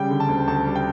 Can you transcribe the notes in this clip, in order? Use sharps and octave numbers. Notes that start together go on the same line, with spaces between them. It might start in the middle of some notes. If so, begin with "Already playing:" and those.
Already playing: C#3 G3 G5
D3
A5
D2
D2 A5
G3
G5